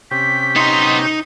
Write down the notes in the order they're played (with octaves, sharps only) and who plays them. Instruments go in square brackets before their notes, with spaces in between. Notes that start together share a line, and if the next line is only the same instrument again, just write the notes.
[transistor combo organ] C3 C#4 G4 [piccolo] B6
[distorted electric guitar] B3 C6 [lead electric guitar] D#4 A#5